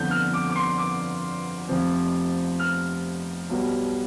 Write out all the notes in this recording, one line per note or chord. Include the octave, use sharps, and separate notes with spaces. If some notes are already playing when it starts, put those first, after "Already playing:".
Already playing: G1 F2 D3 G6
F6
D6
D6
C6
D6
F1 F2 C3 F3 C4
F6
B1 B2 G3